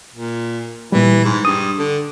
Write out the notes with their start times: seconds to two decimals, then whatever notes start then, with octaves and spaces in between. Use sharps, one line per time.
0.14 A#2
0.92 A#2 E3 G3
1.24 G#2
1.45 G2 D#6
1.79 D3